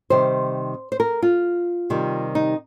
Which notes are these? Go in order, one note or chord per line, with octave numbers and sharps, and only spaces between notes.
C3 D#3 G3 C5
C5
A#4
F4
C3 D#3 G3
D#4